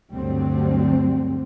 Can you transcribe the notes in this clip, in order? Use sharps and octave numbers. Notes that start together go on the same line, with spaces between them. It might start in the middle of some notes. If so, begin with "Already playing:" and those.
D2 G2 D3 F#3 G3 C4